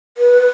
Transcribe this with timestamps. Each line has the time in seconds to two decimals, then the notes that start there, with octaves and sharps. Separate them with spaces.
0.18 B4